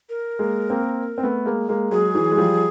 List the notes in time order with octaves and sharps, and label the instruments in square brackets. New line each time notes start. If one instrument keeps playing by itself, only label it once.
[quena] A#4
[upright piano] G#3 A#3
A#3 C4
C4
A3 B3
G#3 A#3
G#3 A#3
[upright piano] F#3 G#3 [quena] G#4
[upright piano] E3 F#3
G#3
F3 G3